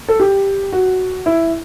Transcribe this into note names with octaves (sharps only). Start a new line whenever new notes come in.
A4
G4
F#4
E4